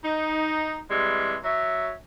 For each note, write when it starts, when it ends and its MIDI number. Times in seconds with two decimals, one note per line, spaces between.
0.03 0.79 63
0.89 1.35 48
0.89 1.35 52
0.89 1.35 55
0.89 1.35 56
1.43 1.92 54
1.43 1.92 73
1.43 1.92 76